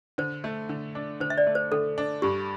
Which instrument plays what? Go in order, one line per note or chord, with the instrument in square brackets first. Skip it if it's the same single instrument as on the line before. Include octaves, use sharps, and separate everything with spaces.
[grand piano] D3 [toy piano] C5
[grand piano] A3
D3
D4
[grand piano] D3 [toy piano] C5
[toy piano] E5
D5
[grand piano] A3
[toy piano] C5
[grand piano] D3 [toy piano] A4
[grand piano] D4
[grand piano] G2 [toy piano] G4